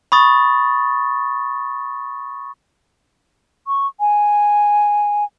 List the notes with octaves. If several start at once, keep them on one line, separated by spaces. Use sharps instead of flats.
B5 C#6 D#6 A6
C#6
G#5